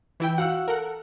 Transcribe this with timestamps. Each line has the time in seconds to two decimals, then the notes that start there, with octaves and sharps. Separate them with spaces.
0.20 E3 E4 G5
0.38 F#4 F5 F#5 E6 F#6
0.68 A4 A#4 F#5